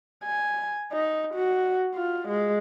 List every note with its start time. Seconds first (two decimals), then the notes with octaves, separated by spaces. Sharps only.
0.24 G#5
0.92 D#4
1.34 F#4
1.95 F4
2.28 G#3